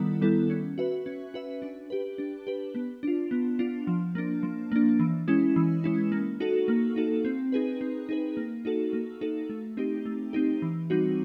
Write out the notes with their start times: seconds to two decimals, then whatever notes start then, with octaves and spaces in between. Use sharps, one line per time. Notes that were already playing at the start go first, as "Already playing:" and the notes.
Already playing: D#3 G3 B3 E4 A4
0.21 G3 B3 E4 A4
0.50 C#4
0.78 F#4 B4 E5
1.06 C#4
1.34 F#4 B4 E5
1.62 D4
1.90 G4 B4
2.18 D4
2.47 G4 B4
2.75 B3
3.03 D4 F4
3.31 B3
3.59 D4 F4
3.87 F3
4.15 A#3 D4
4.43 F3
4.72 A#3 D4
5.00 E3
5.28 G#3 C#4 E4
5.56 E3
5.84 G#3 C#4 E4
6.12 A#3
6.40 D#4 F#4 A4
6.68 A#3
6.96 D#4 F#4 A4
7.25 C4
7.52 D#4 G#4 B4
7.81 C4
8.09 D#4 G#4 B4
8.37 A#3
8.65 D#4 F#4 A4
8.93 A#3
9.21 D#4 F#4 A4
9.49 A3
9.77 C4 D#4 G4
10.06 A3
10.33 C4 D#4 G4
10.62 E3
10.90 G3 C4 D#4 F#4